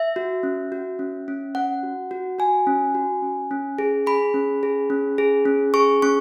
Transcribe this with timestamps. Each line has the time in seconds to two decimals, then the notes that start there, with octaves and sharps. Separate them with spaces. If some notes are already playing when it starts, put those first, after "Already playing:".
Already playing: E5
0.16 F#4
0.43 C#4
0.72 F#4
0.99 C#4
1.28 C#4
1.55 C#4 F#5
1.83 F#4
2.11 F#4
2.39 F#4 G#5
2.67 C#4
2.95 F#4
3.22 C#4
3.51 C#4
3.79 G#4
4.07 G#4 B5
4.34 C#4
4.63 G#4
4.90 C#4
5.18 G#4
5.46 C#4
5.74 G#4 C#6
6.02 C#4 C#6